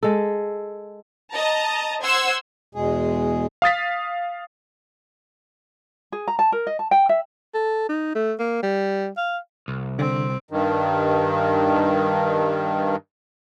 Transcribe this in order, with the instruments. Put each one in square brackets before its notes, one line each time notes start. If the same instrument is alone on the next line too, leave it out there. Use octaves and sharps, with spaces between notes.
[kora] G#3 A4
[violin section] D#5 A5 A#5
C5 F#5 C6 E6 G#6
[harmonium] E2 B2 G#3 G#4
[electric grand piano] F5 D#6 A6 B6
[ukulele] G#4
A#5
A5
A#4
D#5
A5
G5
E5
[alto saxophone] A4
D#4
A3
A#3
G3
F5
[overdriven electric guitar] C2
[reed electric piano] D3 [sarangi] C4
[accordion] G2 D#3